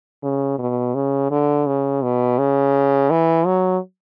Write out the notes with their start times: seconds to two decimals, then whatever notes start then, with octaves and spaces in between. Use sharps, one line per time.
0.23 C#3
0.59 B2
0.95 C#3
1.31 D3
1.67 C#3
2.03 B2
2.39 C#3
3.10 E3
3.46 F#3